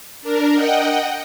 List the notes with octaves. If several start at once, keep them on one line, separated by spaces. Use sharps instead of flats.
D4 A#4
D#5 F#5 G5